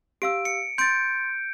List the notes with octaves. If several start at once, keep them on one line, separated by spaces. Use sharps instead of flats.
G4 F5 E6 D7
C#7
C6 G6 A6 D7